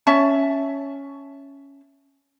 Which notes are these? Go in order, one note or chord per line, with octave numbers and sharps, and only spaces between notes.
C#4 E5 A5